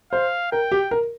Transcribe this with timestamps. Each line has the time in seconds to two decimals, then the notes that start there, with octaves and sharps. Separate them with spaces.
0.12 C5 F5
0.52 A#4 G5
0.72 G4
0.91 A#4